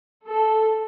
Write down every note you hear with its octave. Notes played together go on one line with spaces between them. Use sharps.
A4